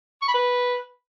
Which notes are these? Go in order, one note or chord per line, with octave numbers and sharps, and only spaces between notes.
C#6
B5
B4